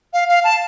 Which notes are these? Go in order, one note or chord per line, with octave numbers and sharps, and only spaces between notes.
F5
F5
A5